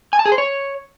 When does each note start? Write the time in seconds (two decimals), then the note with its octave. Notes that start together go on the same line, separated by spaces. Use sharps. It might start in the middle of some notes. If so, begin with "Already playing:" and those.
0.13 G#5
0.19 A5
0.25 G#4
0.32 C5
0.38 C#5